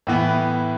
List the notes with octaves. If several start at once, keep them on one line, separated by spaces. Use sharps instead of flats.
A2 E3 B3